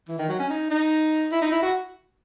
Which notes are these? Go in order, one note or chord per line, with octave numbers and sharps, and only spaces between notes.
E3
D#3
F#3
C#4
D#4
D#4
E4
D#4
E4
F#4